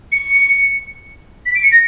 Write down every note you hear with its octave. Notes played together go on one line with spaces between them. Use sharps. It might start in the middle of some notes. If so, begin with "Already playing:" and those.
C#7
B6
D7
C#7
A#6